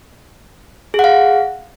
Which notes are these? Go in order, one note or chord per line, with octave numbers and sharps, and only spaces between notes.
G#4 F5 F#5